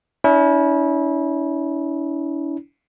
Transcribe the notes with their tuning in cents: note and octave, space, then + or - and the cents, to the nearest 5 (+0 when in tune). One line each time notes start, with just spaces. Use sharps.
C#4 +40 E4 -30